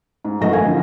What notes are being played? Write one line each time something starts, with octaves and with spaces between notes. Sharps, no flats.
G#2
A1 F#2 F#3 A3 D#5 A#6
A#3 F5 G#5 G#6
D3 F3